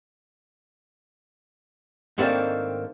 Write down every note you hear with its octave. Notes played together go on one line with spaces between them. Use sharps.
G#2 D#3 A3 A#3 C4 D4